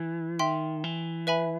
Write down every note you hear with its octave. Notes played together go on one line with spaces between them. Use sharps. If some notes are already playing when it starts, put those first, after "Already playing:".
Already playing: E3
D#3 E5 G5 C6
E3
B4 E5 G#5 B5